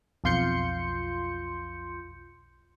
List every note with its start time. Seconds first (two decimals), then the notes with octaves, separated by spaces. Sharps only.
0.24 B1 F2 F4 C6 G6 C#7